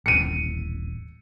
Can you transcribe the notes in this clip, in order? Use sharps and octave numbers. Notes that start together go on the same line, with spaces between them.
D#1 A1 C#7 D#7